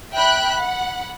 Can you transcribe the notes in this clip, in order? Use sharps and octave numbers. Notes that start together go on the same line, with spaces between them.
E5 G5 B5 F#6
F#5 B5